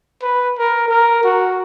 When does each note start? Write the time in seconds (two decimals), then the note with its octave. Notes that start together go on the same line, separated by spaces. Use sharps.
0.22 B4
0.58 A#4
0.88 A#4
1.24 F#4